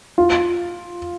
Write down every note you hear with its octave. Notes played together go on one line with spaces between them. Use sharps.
F4